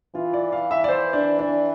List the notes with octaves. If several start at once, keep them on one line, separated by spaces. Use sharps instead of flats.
E3 F4
D5
F5
E5
D5
C5
D4
D4